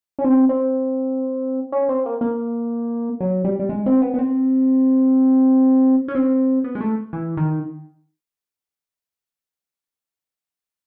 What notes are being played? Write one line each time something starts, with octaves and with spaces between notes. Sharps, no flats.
C#4
C4
C4
C#4
C4
A#3
A#3
F#3
G3
G3
G#3
C4
B3
B3
C4
C#4
C4
B3
G#3
A3
E3
D#3